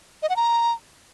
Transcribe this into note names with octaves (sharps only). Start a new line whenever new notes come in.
D#5
F#5
A#5